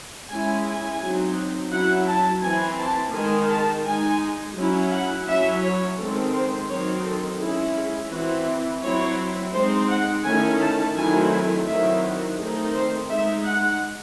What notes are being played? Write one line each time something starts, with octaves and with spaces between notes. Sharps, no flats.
G#3 C#4 E4 G#5
G#5
F#3 C4 D#4
F#3 C#4 E4 F#5
A5
E3 C4 E4 G#5
A5
D#3 G#3 D#4 G#5
A5
G#3 D#4 G#5
F#3 C#4 E4
F#5
F#3 C#4 E4 E5
C#5
D#3 G#3 C4 A4
C5
D#3 F#3 C4 D#4 C#5
A4
G#3 C#4 E4 G#4
G#4
E3 C4 E4 F#4
F#3 C4 E4 C#5
G#3 C4 D#4 C5
F#5
D#3 A3 C#4 E4 G#5
A5
D#3 F#3 A3 C4 E4 G#5
G#5
D#3 F#3 C4 E4 E5
F#4
D#3 A3 C4 D#4 G#4
C5
G#3 D#4 E5
F#5